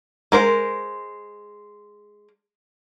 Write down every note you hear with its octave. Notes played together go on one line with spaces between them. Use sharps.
G#3 A#4 C5